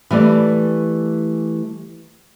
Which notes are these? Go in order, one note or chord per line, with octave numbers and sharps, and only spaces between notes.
E3 G3 A3 D5